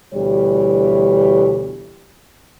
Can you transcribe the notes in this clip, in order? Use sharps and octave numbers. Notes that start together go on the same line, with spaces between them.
D2 B2 E3 G3 G4 C#5